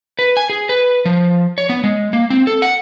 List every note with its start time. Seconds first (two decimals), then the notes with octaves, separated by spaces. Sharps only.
0.19 B4
0.37 G#5
0.50 G#4
0.69 B4
1.05 F3
1.58 C#5
1.69 B3
1.84 G#3
2.13 A#3
2.30 C4
2.47 A4
2.62 F#5